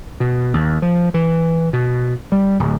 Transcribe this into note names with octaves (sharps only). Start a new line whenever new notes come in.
B2
D#2
F3
E3
B2
G3
D1